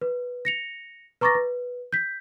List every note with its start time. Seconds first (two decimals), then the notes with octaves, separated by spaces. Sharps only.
0.01 B4
0.45 A#6 C#7 F7
1.21 B4 A#5 C#6 D6 A6 A#6
1.35 B4
1.93 G6 B6